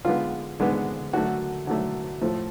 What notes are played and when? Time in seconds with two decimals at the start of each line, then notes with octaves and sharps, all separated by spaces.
0.05 D3 G#3 B3 F4
0.60 D3 G#3 B3
1.13 D3 F#3 A3 F#4
1.67 D3 F#3 A3
2.21 A2 F3 A3